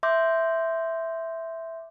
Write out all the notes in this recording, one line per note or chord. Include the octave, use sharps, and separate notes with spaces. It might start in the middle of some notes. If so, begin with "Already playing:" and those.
E5 C6 D6 G6